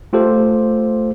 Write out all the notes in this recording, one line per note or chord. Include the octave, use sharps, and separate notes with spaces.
A3 F4 G4 A4 C5